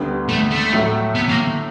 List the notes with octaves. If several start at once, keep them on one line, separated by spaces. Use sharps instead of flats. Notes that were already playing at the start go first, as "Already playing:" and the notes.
Already playing: D2 D3 G3 B3 D4
A3
A3
A2 F#3 A3
B3
A#3